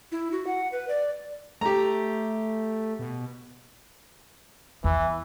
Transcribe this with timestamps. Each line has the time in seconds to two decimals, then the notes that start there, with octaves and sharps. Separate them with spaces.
0.12 E4
0.32 F#4
0.47 F#5
0.72 B4
0.89 D5
1.61 A3 G4 A#5
2.99 B2
4.84 E2 E3